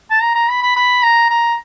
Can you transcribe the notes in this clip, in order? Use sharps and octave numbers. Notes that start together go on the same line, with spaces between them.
A5
A#5
A#5
B5
B5
B5
A#5
A#5